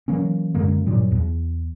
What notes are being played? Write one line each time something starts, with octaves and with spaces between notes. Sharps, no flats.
E3 F#3 A#3 C#4
F#2 D3 G#3 A#3
G2 A#2 F#3 G3
E2